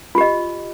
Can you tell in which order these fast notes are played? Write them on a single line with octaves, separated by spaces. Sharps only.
F4 G4 D#5